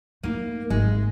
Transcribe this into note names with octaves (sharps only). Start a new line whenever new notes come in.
A3 A#3 D#4
G#1 G#3